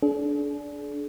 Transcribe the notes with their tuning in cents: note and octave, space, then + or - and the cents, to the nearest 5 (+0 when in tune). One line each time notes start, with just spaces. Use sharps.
D4 -20 G#4 +45